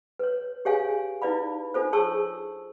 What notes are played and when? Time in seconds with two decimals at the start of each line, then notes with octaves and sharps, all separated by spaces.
0.19 B4 C#5
0.65 G4 G#4 C#5 F5 G#5
1.22 D#4 E4 B4 D5 F5 B5
1.74 D4 F4 A4 C5
1.93 G#4 C#5 A5 C#6 E6